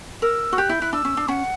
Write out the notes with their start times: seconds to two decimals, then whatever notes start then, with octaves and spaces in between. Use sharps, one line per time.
0.22 A#4 E6
0.53 F#4
0.58 G4 F#6
0.69 E4 G6
0.82 E4 F#6
0.93 D4 E6
1.05 C#4
1.17 D4
1.28 C#4 F#5